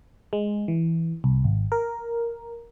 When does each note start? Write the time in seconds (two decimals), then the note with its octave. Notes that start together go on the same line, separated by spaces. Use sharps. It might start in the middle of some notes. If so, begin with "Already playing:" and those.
0.33 G#3
0.68 E3
1.24 C2
1.44 G#1
1.72 A#4